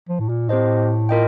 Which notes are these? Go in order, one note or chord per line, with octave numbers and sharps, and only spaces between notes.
F3
A2
A#2
A2 C4 G4 C5 D#5
F4 A#4 D#5 G5